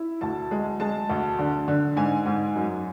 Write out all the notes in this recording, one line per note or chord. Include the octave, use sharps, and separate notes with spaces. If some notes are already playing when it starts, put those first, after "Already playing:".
Already playing: E4
D2 A5
G#3
G#3 A5
D2
D3
D3
G#2 G#5
G#2
F#2